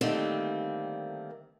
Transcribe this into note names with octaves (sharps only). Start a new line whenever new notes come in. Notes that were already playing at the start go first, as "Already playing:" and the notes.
D3 D#3 G3 A3 A#3 C4